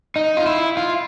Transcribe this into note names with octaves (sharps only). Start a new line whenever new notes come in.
D#4
F4
E4
F4